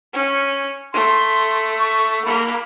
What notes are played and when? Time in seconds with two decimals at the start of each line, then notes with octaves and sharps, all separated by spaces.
0.13 C#4
0.93 A3 C6
1.79 C#6
2.25 A#3 B5